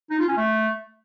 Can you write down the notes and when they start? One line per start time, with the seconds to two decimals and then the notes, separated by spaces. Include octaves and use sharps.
0.10 D#4
0.19 F4
0.28 C#4
0.37 A3